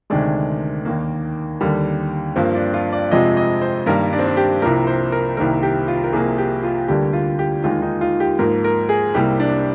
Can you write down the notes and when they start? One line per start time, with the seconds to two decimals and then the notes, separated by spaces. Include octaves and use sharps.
0.10 D2 C3 D#3 G#3 D4
0.85 D#2 D#3 A#3
1.61 D#2 D3 G3 A#3
2.36 G2 F3 A#3 C4
2.55 D4
2.74 F4
2.93 D5
3.11 F2 C3 F3 G#3 D#5
3.37 D#5
3.62 C5
3.86 G2 D#3 G3 A#3 A#4
4.12 D4
4.19 C4
4.27 D4
4.37 G4
4.62 C2 C3 F3 A#3 A#4
4.87 C5
5.12 A#4
5.37 C2 C3 D#3 A#3 A#4
5.63 G4
5.88 F4
6.04 A#4
6.13 C2 C3 F3 A#3 G#4
6.38 G4
6.63 F4
6.88 D2 D3 G3 A#3 G4
7.13 F4
7.39 G4
7.63 D#2 D#3 G#3 F4
7.82 D#4
8.01 F4
8.20 G4
8.39 G#2 F3 A#3 A#4
8.64 A#4
8.89 G#4
9.14 C2 C3 G3 A#3 G4
9.40 D4